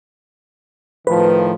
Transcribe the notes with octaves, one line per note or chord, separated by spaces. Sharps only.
A2 D#3 F3 B4